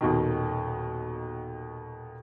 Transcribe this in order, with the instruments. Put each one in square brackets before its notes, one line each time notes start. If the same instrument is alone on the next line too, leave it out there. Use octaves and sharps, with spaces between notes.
[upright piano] D#1 D#2 B2 D#3